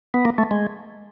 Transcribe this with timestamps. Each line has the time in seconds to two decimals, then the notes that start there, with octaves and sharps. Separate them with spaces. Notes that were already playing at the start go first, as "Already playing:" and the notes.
0.14 B3
0.25 A#3
0.38 A3
0.51 G#3